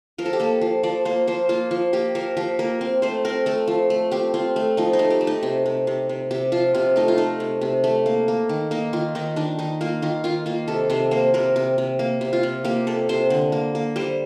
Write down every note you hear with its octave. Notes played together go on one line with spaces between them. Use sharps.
F3 A#4
A4
G4
A#3 A4
F3
F3 D5
A#3 C5
F3 C5
A#3 F4
F3
A#3 G4
F3 A#4
F3 G4
A#3 A#4
C4
A3 C5
C4 A#4
A3 A4
F3
A3
C4 G4
C4 F4
A3
F3 D#4
D#4
A3
G4
A3
D#4
C3
C3
C3
C3
C3 G4
F3 F4
C3 F4
A3 D#4
F4
A3 D#4
C3
C3
A3
A#3
A#3
D#3
A#3 D#4
D#3 F4
D#3 D#4
D#3 D4
D#3 D#4
A#3 F4
D#3 F4
D#3 F4
A#3 F4
C3 A4
C3 C5
A#3 C5
C3 A#4
C3
C3
A#3
C3
F4
C3
A#3 G4
C3 A4
C3 C5
D3
A#3
A#3
G3 C5